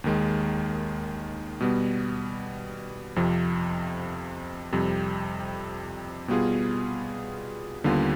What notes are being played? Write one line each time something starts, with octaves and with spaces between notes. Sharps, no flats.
D#2 D#3 G#3
B2 G3 B3
F2 C3 F3
F2 C3 G3 C4
B2 G3 B3 F4 G#4
D#2 D3 G3 B3 F4